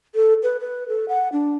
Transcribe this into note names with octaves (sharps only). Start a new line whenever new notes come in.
A4
B4
B4
A4
F#5
D4